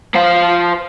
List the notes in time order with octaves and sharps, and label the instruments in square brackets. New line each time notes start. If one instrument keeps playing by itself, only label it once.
[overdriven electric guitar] F3 F5